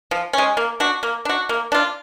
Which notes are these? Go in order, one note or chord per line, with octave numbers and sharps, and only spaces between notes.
F3
G#3 C#4
A#3
D4 F#4
A#3
D4 F#4
A#3
D4 F4